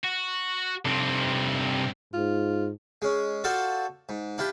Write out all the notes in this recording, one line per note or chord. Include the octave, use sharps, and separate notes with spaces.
F#4
G2 C3 C4 A4
G#2 F4
G#3 C#4
F4 F#4 A4 C5 D5
G#2
D4 E4 F4 G4